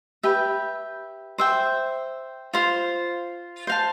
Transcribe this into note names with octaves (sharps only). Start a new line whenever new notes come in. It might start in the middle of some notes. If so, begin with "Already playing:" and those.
G4 B4 E5 G5
C5 E5 G5
F4 C5 F5
C5 F5 A5